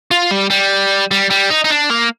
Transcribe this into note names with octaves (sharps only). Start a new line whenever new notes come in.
F4
G3
G3
G3
G3
D#4
D#4
D4
A#3